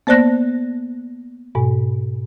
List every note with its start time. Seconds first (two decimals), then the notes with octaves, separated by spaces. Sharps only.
0.07 A#3 B3 C5 D5 F#6 A#6
1.55 G#2 B2